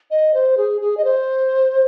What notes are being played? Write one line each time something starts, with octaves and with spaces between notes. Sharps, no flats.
D#5
C5
G#4
G#4
D#5
C5